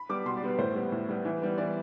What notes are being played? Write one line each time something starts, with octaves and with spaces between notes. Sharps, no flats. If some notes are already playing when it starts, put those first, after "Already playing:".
Already playing: B5
G3 B3 D6
B2 C6
D5
G3 B3 B4
A2 C5
G3 B3
A2
G3 B3
E3
G3 B3
E3 D5